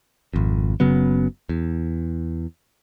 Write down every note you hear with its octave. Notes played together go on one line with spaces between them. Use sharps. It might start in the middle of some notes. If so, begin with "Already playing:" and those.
G#1 F2
F#1 C#3 F#3 B3
E2